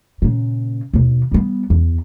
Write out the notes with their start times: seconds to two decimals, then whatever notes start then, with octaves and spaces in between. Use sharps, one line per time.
0.22 A#2 C#3
0.94 D#2 B2
1.32 G3 B3
1.70 E2